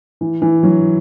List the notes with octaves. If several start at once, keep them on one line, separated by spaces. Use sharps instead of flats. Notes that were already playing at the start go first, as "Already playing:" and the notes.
E3
E3
F#3